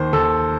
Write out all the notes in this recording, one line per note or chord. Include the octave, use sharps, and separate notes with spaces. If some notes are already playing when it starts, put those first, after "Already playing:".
Already playing: D#2 D#3 C5
D#2 A4